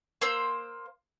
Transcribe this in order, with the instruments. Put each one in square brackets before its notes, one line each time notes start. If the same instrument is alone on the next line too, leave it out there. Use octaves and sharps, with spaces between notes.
[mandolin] A#3 C5 E6